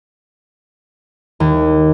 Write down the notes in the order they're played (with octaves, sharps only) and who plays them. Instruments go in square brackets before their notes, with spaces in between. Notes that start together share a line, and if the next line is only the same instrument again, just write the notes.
[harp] D#2